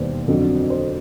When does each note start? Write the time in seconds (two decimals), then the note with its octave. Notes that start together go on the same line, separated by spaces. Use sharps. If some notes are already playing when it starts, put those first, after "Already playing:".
Already playing: E1 D#2 D#3 G3 B4 C5 D5
0.28 F2 D3 F#3
0.70 C5